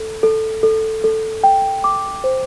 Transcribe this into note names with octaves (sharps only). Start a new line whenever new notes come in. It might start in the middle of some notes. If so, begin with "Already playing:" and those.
Already playing: A4
A4
A4
A4
G5
D6
C5